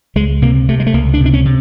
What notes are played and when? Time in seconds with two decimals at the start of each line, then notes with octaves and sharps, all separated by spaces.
0.16 C#2 G#3
0.42 C3 A#3
0.69 C3 A3
0.80 G#3
0.87 A3
0.94 C#2 A#3
1.14 D4
1.20 C3
1.26 D4
1.33 C#4
1.45 C3